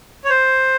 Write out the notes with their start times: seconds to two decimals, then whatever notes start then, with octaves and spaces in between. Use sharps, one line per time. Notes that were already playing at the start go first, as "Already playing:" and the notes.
0.24 C#5
0.30 C5